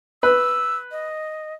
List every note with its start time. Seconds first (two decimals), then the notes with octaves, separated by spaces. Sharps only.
0.23 B4 E6
0.91 D#5